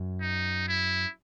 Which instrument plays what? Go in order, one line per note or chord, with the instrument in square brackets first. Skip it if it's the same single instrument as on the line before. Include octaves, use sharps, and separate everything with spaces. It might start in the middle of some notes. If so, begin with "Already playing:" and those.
Already playing: [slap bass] F#2
[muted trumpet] D#4
E4